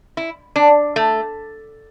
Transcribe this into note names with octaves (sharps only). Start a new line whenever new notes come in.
E4
D4
A3